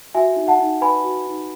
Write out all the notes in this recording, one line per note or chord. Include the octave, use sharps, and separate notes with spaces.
F#4 E5 G#5
D#4
F#5 A5
D#4
B4 G#5 B5
F#4
D#4